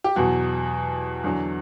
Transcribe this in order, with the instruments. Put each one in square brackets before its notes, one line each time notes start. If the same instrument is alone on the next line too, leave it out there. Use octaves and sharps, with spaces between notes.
[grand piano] G4
E2 B2 F#3 F#4
E2 D3 F#3